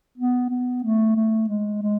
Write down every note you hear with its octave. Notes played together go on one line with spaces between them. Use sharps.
B3
B3
A3
A3
G#3
G#3